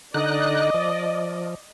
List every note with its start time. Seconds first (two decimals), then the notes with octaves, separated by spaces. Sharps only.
0.14 D3 D#4 D5 D#5 F#6
0.74 F3